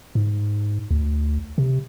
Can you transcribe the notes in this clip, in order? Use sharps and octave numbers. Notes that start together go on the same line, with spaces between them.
G#2
D2
C3